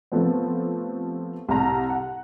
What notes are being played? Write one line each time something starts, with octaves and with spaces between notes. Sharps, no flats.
C3 F3 A3 B3 C4
C2 A5 A#5
F#5